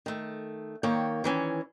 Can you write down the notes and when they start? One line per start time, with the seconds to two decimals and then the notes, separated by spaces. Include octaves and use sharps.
0.06 D#3 A3
0.83 D#3 A#3 C#5 G5
1.24 D#3 E3 C#4